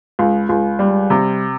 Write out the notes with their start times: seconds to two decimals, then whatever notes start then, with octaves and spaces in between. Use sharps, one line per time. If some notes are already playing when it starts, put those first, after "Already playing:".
0.19 C#2
0.49 C#2
0.79 G3
1.10 C3